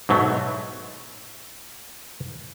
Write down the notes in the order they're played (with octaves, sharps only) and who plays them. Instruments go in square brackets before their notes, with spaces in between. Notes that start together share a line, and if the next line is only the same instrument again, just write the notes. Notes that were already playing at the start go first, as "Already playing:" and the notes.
[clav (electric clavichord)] G#2 B2 F#3 A3